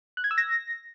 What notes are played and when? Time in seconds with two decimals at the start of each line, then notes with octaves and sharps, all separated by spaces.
0.17 F#6
0.24 G#6
0.31 E6
0.38 A#6